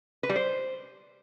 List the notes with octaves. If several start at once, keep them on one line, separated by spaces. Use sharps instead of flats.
B4
G3
C5